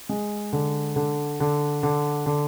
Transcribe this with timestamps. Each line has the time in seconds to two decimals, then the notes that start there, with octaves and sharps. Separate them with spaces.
0.09 G#3
0.53 D3
0.96 D3
1.40 D3
1.83 D3
2.26 D3